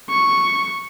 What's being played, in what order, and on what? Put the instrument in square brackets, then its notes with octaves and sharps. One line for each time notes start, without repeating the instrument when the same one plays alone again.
[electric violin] C#6